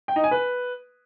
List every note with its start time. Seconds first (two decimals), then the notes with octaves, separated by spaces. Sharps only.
0.08 G5
0.16 D#4
0.24 G#5
0.31 B4